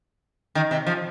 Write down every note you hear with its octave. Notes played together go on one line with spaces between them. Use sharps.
D#3
C3
F3